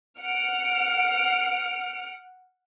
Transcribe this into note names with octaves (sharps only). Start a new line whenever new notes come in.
F#5 F6 C#7 D7